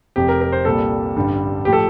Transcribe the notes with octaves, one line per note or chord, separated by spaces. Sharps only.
F1 F2 C3 G4
A#4
A#4
C5
C2 A#2 G3 A#3 A4
A1 G2 D3 G3
A2 F3 A3 G4
A4